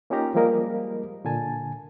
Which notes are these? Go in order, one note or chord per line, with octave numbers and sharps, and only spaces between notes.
A#3 C#4 D#4 F4 G4 A#5
F3 G3 G#3 A#3 A#4 D#5
A#2 D3 G#5 A5